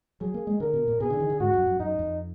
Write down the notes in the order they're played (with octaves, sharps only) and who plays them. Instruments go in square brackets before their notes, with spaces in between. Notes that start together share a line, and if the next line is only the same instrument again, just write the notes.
[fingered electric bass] F#3 [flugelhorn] G#4
[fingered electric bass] A#3
G#3
[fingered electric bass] D3 [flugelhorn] A#4
[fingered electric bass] B2
A#2
[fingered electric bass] B2 [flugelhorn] G#4
[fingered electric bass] D3
D#3
D3
[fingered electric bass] G#2 [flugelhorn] F#4
[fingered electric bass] F#2
F#2
[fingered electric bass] F#2 [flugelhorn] D#4
[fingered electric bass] F2